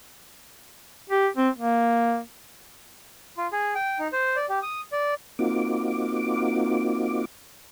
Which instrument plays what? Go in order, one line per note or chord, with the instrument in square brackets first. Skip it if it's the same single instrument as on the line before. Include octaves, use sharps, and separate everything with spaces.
[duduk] G4
C4
A#3
[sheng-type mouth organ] F4
G#4
G5
D#4
C5
D5
G4
D#6
D5
[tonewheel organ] A#3 C4 D#4 F4 F#4 D6